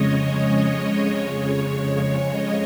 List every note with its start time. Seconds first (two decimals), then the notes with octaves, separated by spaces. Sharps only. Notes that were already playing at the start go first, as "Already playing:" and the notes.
Already playing: F2 C#3 G#3 C#5 D#5
0.27 C#5
1.09 F2 C#3 G#3 C#5
2.33 D#5